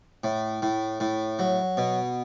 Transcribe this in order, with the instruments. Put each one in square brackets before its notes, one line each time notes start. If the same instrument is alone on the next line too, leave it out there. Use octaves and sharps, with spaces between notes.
[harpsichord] A2
A2
A2
F#3
B2